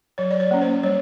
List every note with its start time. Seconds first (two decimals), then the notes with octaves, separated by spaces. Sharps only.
0.18 F#3 C#5
0.31 D5
0.40 C#5
0.51 A#3 C#4
0.62 C5
0.83 G3 C#5